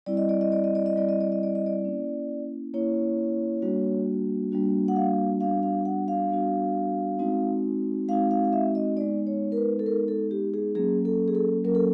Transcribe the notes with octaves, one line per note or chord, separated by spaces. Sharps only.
G3 C4 E4 D5
D#5
D5
D#5
D5
D#5
D5
D#5
G3 C4 E4 D5
D#5
D5
D#5
D5
D#5
D5
A#3 C#4 E4
A#3 C#4 E4 C#5
G3 A#3 D4 F#4
G3 A#3 D4 F#4
F#5
F5
G3 B3 D4 F#4 F5
F5
F#5
F5
G3 B3 D4 F#4
G#3 C4 D#4 F#4
G#3 C4 D#4 F#4 F5
F5
F5
E5
D#5
G#3 B3 D#4 D5
C#5
A#4
B4
A4
G#3 B3 D#4 A#4
A4
G4
G#4
F#3 A#3 C#4 G#4
A4
G#4
A4
F#3 A#3 C#4 A#4
A4